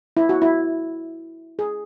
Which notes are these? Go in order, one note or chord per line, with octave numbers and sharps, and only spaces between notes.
E4
F#4
E4
G#4